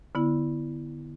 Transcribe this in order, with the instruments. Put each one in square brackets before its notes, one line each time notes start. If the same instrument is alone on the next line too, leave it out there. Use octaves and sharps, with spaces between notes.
[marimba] D3 B3 E4